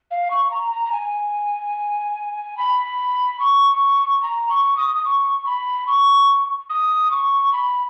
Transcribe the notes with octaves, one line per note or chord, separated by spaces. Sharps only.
F5
C#6
A#5
A#5
A#5
G#5
B5
C#6
A#5
C#6
D#6
D#6
C#6
B5
C#6
D#6
C#6
B5